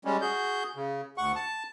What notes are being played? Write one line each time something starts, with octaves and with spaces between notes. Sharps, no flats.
G3 G#3 C#4
F#4 G#4 G6
C#3
D2 F#5 C#6
A5